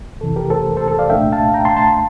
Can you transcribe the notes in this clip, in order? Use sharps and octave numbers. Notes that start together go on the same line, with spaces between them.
F2 C3 E3 A4
G4 A#4
A4 C5
A4 C5
A4
D5 F5
C2 A#2 A3 D4 E5 G5
F5 A5
G5 A#5
A5 C6
A5 C6
A5 C6